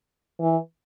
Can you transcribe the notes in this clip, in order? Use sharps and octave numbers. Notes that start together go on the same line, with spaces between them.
E3